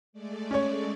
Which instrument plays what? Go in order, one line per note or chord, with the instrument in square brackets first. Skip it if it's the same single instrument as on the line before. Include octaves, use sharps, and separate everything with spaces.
[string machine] G#3 A3 D5
[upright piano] C#4 C#5